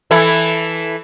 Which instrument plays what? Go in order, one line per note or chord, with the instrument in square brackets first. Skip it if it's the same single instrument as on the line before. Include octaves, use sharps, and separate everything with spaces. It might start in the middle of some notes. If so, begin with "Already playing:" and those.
[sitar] E3 E4 A4